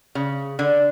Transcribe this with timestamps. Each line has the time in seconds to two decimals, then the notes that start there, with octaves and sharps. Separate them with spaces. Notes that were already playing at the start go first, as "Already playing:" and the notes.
0.15 C#3
0.59 D3